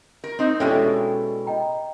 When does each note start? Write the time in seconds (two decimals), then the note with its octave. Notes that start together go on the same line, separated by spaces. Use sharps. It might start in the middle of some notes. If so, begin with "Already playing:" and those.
0.24 A#4
0.39 C4 D#4
0.60 B2 G#3 C#4 D4 E4 G4 A4 G5
1.47 D#5 G5 A#5